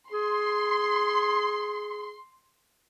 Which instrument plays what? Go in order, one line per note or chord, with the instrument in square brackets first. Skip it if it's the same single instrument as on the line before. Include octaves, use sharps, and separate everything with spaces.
[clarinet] G#4 [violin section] C6